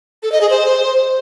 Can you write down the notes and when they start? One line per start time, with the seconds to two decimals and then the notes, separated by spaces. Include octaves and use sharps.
0.23 A4
0.32 D#5
0.41 G#4
0.50 C5